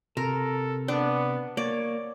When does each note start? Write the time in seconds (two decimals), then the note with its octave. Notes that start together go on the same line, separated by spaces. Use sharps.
0.17 C3 A4 A#4
0.88 B3 D4
1.57 A#3 C#5 D5